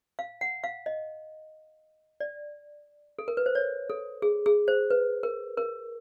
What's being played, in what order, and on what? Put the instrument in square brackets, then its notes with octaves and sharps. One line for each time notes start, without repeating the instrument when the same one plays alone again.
[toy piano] F5
F#5
F5
D#5
D5
A4
A#4
B4
C5
C#5
A4
G#4
G#4
C5
B4
A#4
A#4